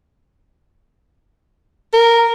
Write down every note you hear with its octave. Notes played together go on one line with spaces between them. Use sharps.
A#4